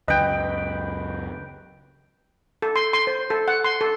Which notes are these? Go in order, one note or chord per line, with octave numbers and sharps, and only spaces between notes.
C#2 F#2 B4 D#5 G5
A4
C6
C6
C5
A4
F#5
C6
A4